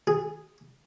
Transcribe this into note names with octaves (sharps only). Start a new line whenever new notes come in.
G#4